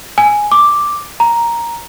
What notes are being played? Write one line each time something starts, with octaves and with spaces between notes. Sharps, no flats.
G#5
D6
A#5